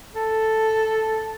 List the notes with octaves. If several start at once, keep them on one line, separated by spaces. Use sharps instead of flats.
A4